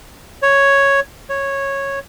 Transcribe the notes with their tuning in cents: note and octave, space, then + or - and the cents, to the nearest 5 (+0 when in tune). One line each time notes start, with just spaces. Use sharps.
C#5 +0
C#5 -10